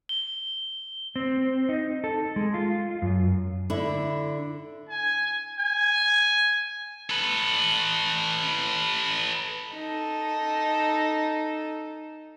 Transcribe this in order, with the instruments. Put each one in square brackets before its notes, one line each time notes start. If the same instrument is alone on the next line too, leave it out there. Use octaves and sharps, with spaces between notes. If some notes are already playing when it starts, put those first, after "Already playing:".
[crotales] G7
[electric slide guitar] C4
D#4
A4
G#3
F4
F#2
[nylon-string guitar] D3 E4
[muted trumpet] G#5
G#5
[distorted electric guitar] A4 B4
[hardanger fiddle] D#4 A4